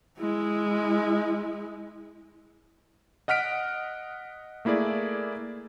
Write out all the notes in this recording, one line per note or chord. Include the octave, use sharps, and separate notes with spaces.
G#3 E4
D#5 F#5 F6 B6 D7
A3 A#3 E4 G#4 D5